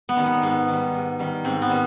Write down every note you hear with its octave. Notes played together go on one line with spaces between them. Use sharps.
B3
D#3 G3
B3
G#2 B3
D#3 G3
G#2
D#3 G3
G#2 C4
B3
D#3 G3